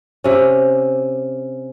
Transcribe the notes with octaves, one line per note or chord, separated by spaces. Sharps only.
C3 C#4